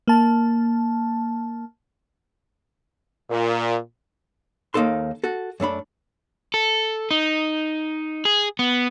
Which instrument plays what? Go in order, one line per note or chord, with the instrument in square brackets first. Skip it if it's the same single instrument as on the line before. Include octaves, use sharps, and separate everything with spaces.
[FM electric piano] A#3 A5
[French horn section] A#2
[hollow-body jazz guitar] D#2 A#3 D#4 A4 C6
F#4 A4
F#2 A3 D4 B5
[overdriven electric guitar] A4
D#4
G#4
B3